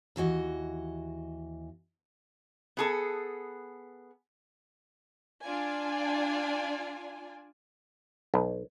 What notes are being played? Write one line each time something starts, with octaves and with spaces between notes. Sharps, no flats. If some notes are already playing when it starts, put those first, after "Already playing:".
D#2 E3 F#4 D#5
B3 G#4 A4
D4 F4 D5 G#5
B1